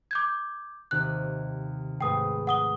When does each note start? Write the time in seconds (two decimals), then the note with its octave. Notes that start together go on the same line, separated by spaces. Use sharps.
0.11 D6 G6 G#6
0.91 D#2 C3 D#3 F#6
2.01 G#2 A3 B4 G5 D#6
2.47 F#5 D#6 G7